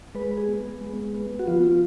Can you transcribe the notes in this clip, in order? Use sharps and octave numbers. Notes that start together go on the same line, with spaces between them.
G#3 B4
G#4
B3
G#3
B3
F#4
F3 F4
F4